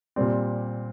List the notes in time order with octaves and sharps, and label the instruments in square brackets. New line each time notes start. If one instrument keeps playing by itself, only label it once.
[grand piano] A#2 G3 C4 D5